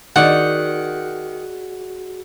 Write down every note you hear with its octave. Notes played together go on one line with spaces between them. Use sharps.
D#3 F#4 G#4 D5 F#5